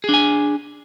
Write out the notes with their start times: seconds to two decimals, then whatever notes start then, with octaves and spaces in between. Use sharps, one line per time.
0.04 G#4
0.09 D4
0.14 G#5